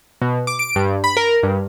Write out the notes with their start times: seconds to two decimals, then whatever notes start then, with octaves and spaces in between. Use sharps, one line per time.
0.21 B2
0.47 D6
0.59 D7
0.75 G2
1.04 B5
1.17 A#4
1.43 G2